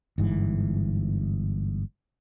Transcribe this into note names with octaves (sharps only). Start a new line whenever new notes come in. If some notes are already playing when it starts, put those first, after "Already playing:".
G1 G#2 E3